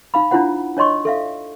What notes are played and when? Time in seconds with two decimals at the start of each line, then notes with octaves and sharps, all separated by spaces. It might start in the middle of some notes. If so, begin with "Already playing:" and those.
0.14 D#4 F5 B5
0.31 D4 E4 F4 C5 F#5
0.77 D4 C#5 D#5 C6 C#6
1.05 A4 E5 F5